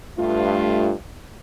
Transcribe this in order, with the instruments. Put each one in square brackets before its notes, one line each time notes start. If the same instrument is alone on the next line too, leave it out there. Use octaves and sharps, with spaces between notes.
[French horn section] G2 A3 F4